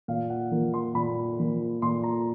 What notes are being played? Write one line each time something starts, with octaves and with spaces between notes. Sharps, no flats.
A#2 F5
F#5
F3 A#3
C6
A#2 B5
F3 A#3
A#2 C6
A#5